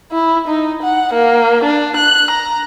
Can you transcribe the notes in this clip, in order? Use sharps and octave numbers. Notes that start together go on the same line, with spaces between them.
E4
D#4
F#5
A#3
D4
F#6
A#5